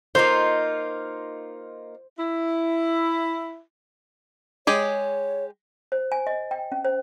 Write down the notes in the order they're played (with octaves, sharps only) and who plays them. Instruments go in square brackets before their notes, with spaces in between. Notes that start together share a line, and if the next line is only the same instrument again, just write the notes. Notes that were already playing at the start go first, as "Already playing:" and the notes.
[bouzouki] A#3 D#4 F4 [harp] C5
[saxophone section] E4
[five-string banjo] G#3 G4 G#4 [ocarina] C#5
[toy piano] C5
G#5
D#5
G5
C#4
C5